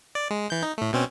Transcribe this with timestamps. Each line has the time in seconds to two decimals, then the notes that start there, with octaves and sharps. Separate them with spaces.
0.15 D5
0.30 G#3
0.50 E3 G6
0.62 D#4
0.78 A2 A3
0.93 B2 C4 C#4